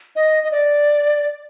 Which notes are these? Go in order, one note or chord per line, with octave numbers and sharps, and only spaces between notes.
D#5
D#5
D5